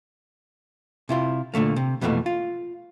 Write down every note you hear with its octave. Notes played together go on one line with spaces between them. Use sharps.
C3 E4 F4
A#2 D3 A3 A#3
C3
F2 B2 E3 F#3 A3 A#3
F4